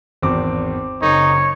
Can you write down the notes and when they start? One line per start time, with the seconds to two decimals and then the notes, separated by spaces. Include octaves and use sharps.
0.22 G#1 E2 C4 D6
1.02 F#1 D#4 C#5